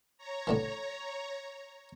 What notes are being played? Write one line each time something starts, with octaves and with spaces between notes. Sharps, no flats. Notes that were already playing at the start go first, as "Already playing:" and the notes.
C#5 A#5
A2 D3 E3